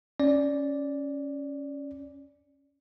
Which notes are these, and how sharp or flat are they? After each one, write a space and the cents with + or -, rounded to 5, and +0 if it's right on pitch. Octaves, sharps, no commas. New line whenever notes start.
C#4 +0 D5 -5